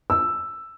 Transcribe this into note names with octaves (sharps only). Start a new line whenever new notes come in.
E6